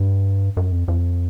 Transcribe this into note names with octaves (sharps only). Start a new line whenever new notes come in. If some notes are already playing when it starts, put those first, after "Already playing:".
Already playing: G2
F#2
F2
F2